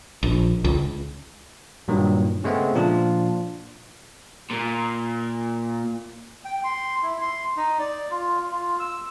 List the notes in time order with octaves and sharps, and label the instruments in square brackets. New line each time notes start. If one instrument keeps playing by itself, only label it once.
[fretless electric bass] A#1
C#2
[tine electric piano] G2 A#2 D#3 F#3
C#3 G#3 A3 B3 C4
A#2 F3 D4 F4
[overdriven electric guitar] A#2
[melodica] G5
C6
E4
C6
D#4
D5
F4
F4
E6